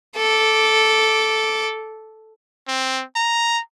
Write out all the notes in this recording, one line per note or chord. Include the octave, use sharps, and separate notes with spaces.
A4 D6
C4
A#5